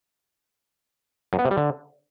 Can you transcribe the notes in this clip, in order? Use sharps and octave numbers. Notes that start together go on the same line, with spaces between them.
F#2
B3
C3
G3
D3